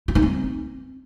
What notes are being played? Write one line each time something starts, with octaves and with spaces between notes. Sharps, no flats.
E4
D#4
C4